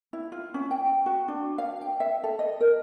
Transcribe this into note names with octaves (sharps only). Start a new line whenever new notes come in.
E4
F4
C#4
G5
F#4
D4
F5
G5
E5
A4
D#5
A#4